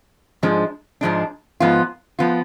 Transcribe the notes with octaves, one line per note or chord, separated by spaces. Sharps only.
G#2 F3 G#3 D4
G#2 F3 G#3 D4
G#2 F3 B3 F4
F3 B3 F4